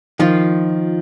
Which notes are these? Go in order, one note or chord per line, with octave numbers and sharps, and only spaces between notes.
D#3 F3 F4